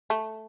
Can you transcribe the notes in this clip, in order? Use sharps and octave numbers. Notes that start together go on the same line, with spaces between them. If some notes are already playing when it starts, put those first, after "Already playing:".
A3